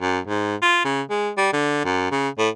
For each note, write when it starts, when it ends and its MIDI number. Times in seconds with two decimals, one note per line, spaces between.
0.01 0.19 42
0.27 0.55 44
0.62 0.80 65
0.84 1.01 49
1.10 1.30 56
1.37 1.53 55
1.53 1.82 50
1.84 2.08 42
2.11 2.29 49
2.38 2.49 45